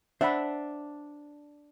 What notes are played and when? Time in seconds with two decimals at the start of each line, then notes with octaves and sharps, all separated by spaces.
0.21 D4 C5 E5 F#5 B5